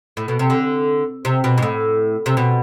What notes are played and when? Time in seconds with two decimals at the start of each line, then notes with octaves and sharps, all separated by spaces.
0.17 A2
0.28 B2
0.39 C3
0.50 D3
1.25 C3
1.44 B2
1.58 G#2
1.62 A2
2.26 C3
2.37 B2